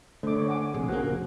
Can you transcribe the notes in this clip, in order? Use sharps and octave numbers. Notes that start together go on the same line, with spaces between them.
D3 A3 C5 D6
C#5
F#5 G#5 D6
A#1 C3 G#4
A#2 C#3 A#3 F#4 G#4 C5 F#6
F1